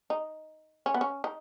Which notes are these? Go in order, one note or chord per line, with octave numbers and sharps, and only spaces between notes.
D#4
C#4
B3
C#4
D#4